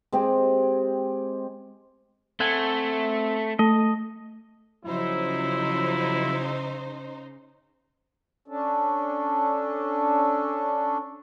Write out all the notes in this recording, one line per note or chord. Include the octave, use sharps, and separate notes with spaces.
G#3 C4 G4
A3 C4 F#5 G#5
A3 D#5
C#3 F3 F#3 D#4 E4 C5
C#4 D4 A4